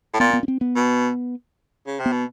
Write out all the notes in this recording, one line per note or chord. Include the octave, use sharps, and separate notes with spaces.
A2
A#2 B3
B3
C#4
C4
B3
B2
C#3
C3
B3
B2